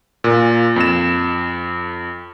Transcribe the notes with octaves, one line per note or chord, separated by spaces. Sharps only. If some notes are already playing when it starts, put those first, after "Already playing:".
A#2
F2 E7